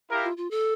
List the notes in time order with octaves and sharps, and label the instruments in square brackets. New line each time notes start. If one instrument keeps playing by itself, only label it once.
[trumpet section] E4 G4 A#4 F5
[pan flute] F4
F4
A4